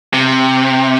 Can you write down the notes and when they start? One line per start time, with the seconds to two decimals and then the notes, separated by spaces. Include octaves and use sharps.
0.14 C3